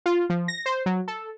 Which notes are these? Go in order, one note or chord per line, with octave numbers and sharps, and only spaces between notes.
F4
F3
A#6
C5
F#3
A4